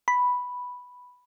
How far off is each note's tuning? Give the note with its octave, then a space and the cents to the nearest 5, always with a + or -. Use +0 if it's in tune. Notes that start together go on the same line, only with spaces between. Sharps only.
B5 +0